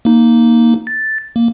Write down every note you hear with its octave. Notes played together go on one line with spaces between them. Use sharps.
A#3 D#4
A6
A#3